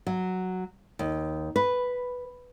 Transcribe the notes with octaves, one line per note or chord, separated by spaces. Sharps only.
F#3
D#2
B4